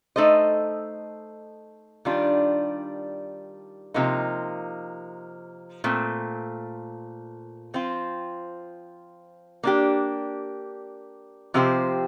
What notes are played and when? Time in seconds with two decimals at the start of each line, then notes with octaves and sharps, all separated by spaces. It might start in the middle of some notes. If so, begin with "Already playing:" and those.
0.16 A3 D#4 A4 C5 D#5
2.05 D#3 G3 D4 F4
3.94 C3 F3 A#3 D#4
5.84 A#2 A3 C4
7.74 F3 C4 F4
9.63 A#3 D4 G4
11.54 C3 F3 C4 G4 C5